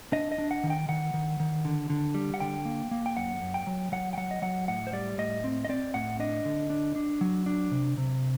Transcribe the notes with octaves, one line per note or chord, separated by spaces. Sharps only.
D4 D#5
D#5
D4
F#5
D#3
G5
D#3 F#5
D#3
D#3
D3
D3
G3
F#5
D3 G5
A#3
A#3
G5
F#2 F#5
F#2
G5
F#3
F#3 F#5
G5
F#3 F#5
D#5
F#3 F#5
A2 F#5
C5
G3 D5
A2 D#5
C4
D#5
C4 D5
A2 F#5
D4 D#5
D3
D4
D4
F#3
D4
C3
C3